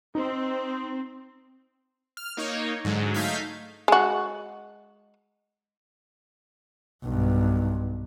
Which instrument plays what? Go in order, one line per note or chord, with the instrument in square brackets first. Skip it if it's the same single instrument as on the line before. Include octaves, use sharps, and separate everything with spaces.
[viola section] C4 [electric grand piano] D#4
[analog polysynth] F6
A#3 D#4 C#5
G#2 D3 F#3 G#3
A3 D#4 F5 G6 G#6 B6
[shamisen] G#3 F#4
[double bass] B1 G2